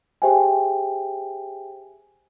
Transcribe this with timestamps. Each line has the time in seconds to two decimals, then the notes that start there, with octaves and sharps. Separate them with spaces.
0.22 G4 G#4 C5 E5 G5 G#5